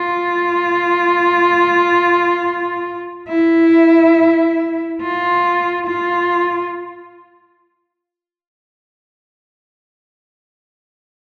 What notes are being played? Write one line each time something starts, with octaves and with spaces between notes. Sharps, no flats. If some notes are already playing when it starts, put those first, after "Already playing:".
Already playing: F4
E4
F4
F4